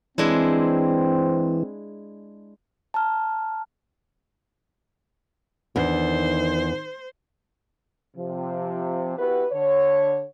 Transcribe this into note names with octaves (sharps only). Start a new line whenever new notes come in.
E3 G#3 C4 D4 E4
A5 A#5 F6
E2 D#3 D4 C5
C3 F3
B3 E4 F#4 G4 B4
D3 C#5